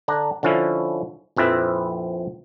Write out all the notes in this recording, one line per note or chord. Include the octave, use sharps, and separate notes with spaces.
D3 D4 A#5
D3 F3 C#4 E4
A#1 F2 C4 E4 B4